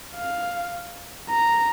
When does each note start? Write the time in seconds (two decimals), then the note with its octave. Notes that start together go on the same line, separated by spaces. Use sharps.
0.15 F5
1.30 A#5